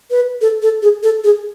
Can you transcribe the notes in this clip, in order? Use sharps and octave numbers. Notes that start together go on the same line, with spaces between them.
B4
A4
A4
G#4
A4
G#4